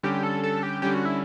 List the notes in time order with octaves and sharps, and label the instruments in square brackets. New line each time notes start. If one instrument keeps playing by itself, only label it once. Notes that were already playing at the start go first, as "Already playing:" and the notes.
[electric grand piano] D3 G3 C#4 [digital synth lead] G4
[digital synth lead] A4
A4
G4
[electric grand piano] D3 G3 C#4 [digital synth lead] G4
[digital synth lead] F#4
E4